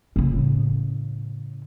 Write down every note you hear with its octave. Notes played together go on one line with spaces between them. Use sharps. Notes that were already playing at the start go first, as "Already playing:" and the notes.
A2 C#3